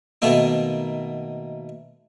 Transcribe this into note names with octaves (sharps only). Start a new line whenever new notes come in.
B2 D#3 A3 A#3 D#4